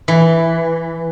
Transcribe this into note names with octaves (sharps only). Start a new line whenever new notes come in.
E3